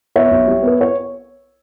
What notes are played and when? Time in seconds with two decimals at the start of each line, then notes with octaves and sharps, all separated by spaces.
0.16 B3 C#5 E5
0.31 B1
0.47 G3
0.62 B3 B4
0.81 C#5